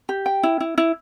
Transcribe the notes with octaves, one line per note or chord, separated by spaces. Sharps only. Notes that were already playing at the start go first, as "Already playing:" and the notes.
G4
G5
E4
E4
E4